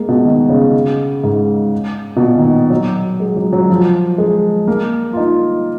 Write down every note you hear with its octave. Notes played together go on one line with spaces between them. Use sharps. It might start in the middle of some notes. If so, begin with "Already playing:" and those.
Already playing: G#3 A#3
B2
D#3
C#3
G#2
B2
A#2
D#3
F#3
G#3
F#3
F#3
F3
G#3
A#3
F4
D#4